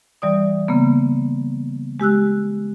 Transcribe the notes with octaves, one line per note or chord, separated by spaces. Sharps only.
E3 G3 D5 D#6
C#3 A#3 B3
G#3 G4 E6 F#6